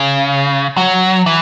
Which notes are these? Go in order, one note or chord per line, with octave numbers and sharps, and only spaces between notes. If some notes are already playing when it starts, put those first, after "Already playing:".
Already playing: C#3
F#3
E3